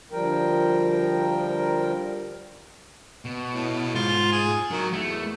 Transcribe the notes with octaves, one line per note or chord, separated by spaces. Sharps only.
D2 F3 G3 A#4 G5
B2
A2
G#2 F4
G#4
D#3 F#3
E2 A3